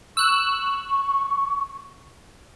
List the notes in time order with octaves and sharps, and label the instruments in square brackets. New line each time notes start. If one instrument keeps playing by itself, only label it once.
[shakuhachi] C#6 [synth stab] E6 F#6